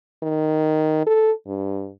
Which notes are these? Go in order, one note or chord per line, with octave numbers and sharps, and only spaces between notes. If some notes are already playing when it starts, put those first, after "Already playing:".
D#3
A4
G2